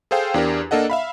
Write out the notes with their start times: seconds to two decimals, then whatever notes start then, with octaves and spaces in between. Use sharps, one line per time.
0.11 G#4 A4 C5 F5 G5
0.34 E2 D4 G4 A#4
0.71 A#3 D4 A4 D#5 F#5
0.90 E5 F5 B5